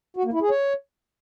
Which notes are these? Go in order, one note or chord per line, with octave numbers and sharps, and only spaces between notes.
F#4
A#3
E4
G#4
C#5